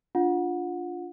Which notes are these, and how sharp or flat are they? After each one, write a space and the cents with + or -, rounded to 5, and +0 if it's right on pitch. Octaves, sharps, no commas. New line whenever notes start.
D4 -10 F4 +0 F#5 -20